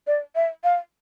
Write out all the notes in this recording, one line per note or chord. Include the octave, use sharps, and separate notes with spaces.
D5
E5
F5